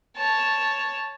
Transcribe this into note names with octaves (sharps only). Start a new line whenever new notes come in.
C#5 A5